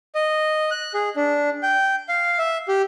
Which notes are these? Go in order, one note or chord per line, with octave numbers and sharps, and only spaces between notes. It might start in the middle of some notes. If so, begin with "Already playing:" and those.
D#5
F#6
G#4
D4
G5
F5
E5
G4